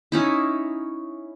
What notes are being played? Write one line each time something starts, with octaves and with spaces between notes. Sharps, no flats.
C#4 D#4 E4